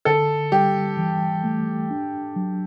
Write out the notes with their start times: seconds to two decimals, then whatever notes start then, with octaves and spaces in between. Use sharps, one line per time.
0.05 D3 A4
0.52 G3 G4
0.97 E3
1.44 A3
1.90 D4
2.36 F#3